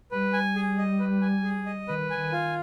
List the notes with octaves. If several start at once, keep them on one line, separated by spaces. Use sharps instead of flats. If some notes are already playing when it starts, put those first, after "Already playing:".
G3 B4
G#5
G#4
D#5
B4
G#5
G#4
D#5
D#3 B4
G#5
D#3
F4